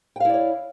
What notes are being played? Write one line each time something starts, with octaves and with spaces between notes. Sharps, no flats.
E4 C#5 D5 F5 G5